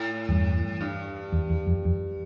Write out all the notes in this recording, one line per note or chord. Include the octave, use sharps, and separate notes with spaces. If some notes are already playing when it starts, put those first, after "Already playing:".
Already playing: A2
E2 G2
G2
E2
E2
F2
F2